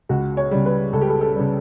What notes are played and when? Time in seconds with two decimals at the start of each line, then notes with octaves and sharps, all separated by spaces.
0.09 C#2 F#4
0.37 C#5
0.51 C#3 G3
0.66 B4
0.93 C#2 A4
1.01 G4
1.10 A4
1.21 A4
1.35 C#3 G3